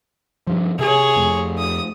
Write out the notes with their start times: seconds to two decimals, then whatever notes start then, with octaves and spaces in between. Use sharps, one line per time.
0.47 G2 F3
0.79 C3 G#4 C#5
1.16 F2 A3
1.58 D#6